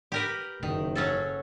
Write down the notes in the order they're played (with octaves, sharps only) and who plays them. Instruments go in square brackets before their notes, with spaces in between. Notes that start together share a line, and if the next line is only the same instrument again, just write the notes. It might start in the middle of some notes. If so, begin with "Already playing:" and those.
[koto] G4 A#4 B4
[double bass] F#1 [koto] D#3
[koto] F#3 C#4 A4